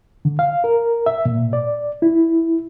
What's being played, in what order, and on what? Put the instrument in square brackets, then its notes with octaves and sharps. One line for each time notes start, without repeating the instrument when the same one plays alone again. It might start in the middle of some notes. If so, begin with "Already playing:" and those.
[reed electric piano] D3
F5
A#4
E5
A#2
D5
E4